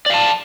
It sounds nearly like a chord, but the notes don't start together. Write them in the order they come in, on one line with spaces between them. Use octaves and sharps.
D5 F5 A5